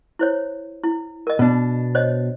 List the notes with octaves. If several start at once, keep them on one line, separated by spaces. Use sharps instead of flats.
E4 C5 C#5
E4
A#4 D#5
B2 D4
C5 C#5 D#5